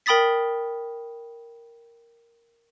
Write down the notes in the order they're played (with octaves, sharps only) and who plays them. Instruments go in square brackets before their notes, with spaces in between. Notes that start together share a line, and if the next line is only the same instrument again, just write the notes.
[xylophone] A#4 G5 B5 D#6 A6 B6